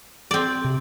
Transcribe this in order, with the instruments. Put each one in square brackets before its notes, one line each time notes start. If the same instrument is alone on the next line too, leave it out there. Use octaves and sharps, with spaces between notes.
[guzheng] C4 D5
[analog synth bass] C3